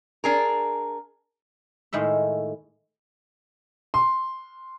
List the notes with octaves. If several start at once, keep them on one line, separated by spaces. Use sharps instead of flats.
D4 G#4 A#4
A2 D#3 G#3 E5
C6